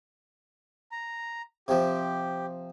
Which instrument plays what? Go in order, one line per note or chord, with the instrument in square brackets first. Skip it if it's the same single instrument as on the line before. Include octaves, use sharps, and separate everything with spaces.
[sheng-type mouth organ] A#5
[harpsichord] C3 F3 [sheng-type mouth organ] G4